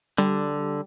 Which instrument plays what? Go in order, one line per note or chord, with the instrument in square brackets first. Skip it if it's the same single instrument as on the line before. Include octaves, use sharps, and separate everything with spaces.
[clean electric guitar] D3 [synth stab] G3